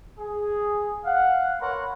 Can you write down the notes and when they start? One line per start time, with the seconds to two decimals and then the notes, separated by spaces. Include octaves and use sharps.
0.19 G#4
1.05 F5 F#5
1.60 A#4 B4 C#5 F#5 B5 C6